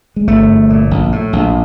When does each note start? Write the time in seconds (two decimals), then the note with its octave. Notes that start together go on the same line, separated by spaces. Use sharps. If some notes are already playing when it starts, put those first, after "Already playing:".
0.16 G#3
0.27 G1 A3
0.48 G1
0.69 A#2
0.91 A#1
1.12 A2
1.33 A#1